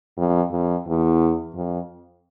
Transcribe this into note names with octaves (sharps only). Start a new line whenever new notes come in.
F2
F2
E2
F2